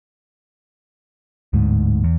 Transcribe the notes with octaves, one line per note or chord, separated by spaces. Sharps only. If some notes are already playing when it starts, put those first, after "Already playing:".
D1 D2 G#2
E2